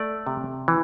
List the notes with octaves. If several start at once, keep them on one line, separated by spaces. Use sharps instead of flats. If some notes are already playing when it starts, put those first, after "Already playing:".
Already playing: A3 D5
C3
E3